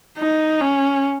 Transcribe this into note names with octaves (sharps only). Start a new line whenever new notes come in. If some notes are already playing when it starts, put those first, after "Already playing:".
D#4
C#4